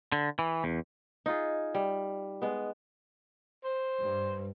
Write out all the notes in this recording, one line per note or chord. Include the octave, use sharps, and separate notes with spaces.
D3
E3
E2
D#4 F4 G#4
G3
G#3 B3
C5
G2